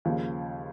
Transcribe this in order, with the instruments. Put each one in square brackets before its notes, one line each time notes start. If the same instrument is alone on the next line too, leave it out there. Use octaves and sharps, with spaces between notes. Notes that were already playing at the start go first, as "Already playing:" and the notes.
[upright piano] D#2 C#3 F3